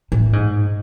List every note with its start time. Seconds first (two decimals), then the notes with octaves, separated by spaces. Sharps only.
0.12 A2
0.33 G#2